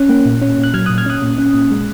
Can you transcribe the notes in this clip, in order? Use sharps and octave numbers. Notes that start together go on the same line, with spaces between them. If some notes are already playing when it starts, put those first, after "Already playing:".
Already playing: C#4 F#6
A#3
A#2
C#4
A#2
F#6
F#3 F6 G#6
A#2 D#6 F#6
F6 G#6
C#4 D#6 F#6
A#2
C#4
A#2
G#3